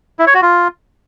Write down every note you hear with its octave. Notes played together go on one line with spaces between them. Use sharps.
E4
C#5
F#4
F4